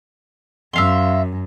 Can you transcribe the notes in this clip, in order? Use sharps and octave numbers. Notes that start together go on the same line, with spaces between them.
F#2 E5 F5 C6